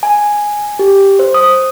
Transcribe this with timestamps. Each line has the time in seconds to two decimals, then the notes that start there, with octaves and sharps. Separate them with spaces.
0.03 G#5
0.79 G4
1.19 C5
1.34 D#6